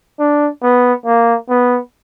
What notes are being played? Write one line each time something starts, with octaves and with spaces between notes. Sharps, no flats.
D4
B3
A#3
B3